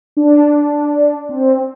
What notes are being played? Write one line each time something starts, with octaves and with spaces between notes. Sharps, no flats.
D4
C4